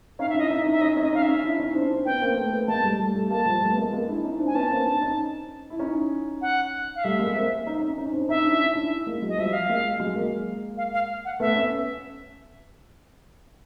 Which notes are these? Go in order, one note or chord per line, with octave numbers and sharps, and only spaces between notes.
C#4 D#4 F5
E5
D4 E4 D#5
C#4 D#4 E5
C#4 D#4
E5
C#4 D#4 D#5
C#4 D#4
D#5
C#4 D#4 F5
E5
C#4 D#4
D4 E4
C#4 D#4
C4 D4
C4 D4
B3 C#4 G5
A#3 C4
A3 B3
A3 B3
G#3 A#3 A5
G3 A3
G3 A3
G3 A3
G#3 A#3 A5
F3 G3
G3 A3
B3
G#3 A#3
G#3 A#3
D4 E4
C#4 D#4
C4 D4
G#5
B3 C#4 A5
A#3 C4
C4 D4
C#4 D#4
E4
C#4 D#4
F#5
F5
G3 A3 E5
G#3 A#3
A#3 C4
C#4 D#4
C#4 D#4
C#4 D#4
C4 D4
C#4 D#4 E5
D4 E4
C#4 D#4
D4 E4
G#3 A#3
F#3 G#3
D#5
F3 G3 E5
F5
G#3 A#3
F#3 G#3
G#3 A#3
F5
F5
F#5
A3 B3 E5
B3 C#4